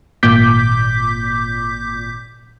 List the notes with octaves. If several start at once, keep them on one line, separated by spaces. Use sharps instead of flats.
G#1 A#2 D6 G6 B6